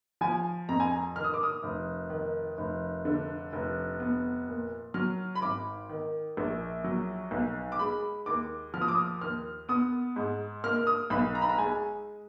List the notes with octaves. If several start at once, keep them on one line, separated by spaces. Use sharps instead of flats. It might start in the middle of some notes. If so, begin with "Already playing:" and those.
F3 G#5
F2 A#5
G#5
A#5
D#3 F6
D#6
D6
D#6
F1
D#3
F1
D3
F1
B3
A#2
F#3 F6
B5
G#1 D6
D#3
A#1
F#3
B1
D6
G#3 B5
D#2 D6
F3 F6
D#6
D6
D#6
D#2 F6
B3 D#6
G#2
A#3 F6
F6
D#6
B1 B5
A#5
B5
A#5
G#3 G#5